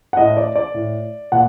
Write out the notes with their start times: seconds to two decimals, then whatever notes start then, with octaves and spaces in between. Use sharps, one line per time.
0.13 F#5
0.17 A2 D#5
0.37 D5
0.56 D5
0.74 A2
1.32 A#2 F#5